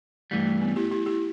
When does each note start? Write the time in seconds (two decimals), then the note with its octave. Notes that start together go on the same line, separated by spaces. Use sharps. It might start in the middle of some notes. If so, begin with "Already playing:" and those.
0.31 G2 E3 G3 A3
0.46 A3
0.62 B3
0.76 E4 G4
0.91 E4 G4
1.06 E4 G4